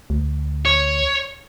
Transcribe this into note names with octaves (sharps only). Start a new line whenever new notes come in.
D2
C#5